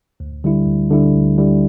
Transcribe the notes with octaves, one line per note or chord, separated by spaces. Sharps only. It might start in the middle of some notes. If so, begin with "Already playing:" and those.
D2
D3 G3 E4
D2
D3 G3 E4
D2
D3 G3 E4